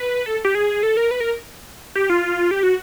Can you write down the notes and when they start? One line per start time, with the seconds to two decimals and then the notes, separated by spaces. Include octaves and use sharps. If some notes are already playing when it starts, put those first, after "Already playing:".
Already playing: B4
0.26 A4
0.45 G4
0.55 G#4
0.83 A4
0.97 A#4
1.11 B4
1.20 A#4
1.95 G4
2.10 F4
2.51 G4
2.63 F#4